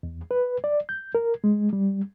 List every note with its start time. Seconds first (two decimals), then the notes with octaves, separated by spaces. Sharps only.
0.03 E2
0.31 B4
0.64 D5
0.89 G6
1.15 A#4
1.44 G#3
1.73 G3